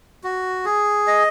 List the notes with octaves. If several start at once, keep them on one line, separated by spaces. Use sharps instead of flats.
F#4
G#4
D#5